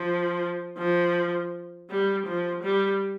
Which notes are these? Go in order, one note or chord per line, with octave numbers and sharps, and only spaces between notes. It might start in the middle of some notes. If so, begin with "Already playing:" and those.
Already playing: F3
F3
G3
F3
G3